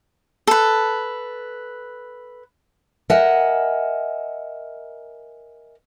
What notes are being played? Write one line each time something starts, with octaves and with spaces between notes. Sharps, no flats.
A4 B4
A#4 D#5 E5 F#5 G#5